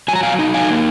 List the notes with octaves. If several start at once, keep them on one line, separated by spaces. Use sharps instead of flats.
F#3 G#5
A#5
F5 G#5
D#4
F5 G#5
A#3